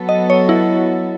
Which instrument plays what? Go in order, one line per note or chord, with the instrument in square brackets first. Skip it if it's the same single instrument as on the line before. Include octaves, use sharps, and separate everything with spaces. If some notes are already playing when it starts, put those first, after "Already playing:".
Already playing: [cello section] F#3 B3 F#4 A4
[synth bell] D#5
C#5
E4